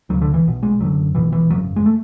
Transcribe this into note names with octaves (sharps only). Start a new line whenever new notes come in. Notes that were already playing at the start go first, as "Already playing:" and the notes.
D2 C#3 F#3
D3
E3
B1 B2
G#3
F#1 F#2 D3 F#3
B1 B2 E3
E3
G#1 F#2 C#3 F#3
G#3
A3